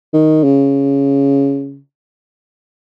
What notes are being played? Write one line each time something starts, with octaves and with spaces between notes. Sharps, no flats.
D#3
C#3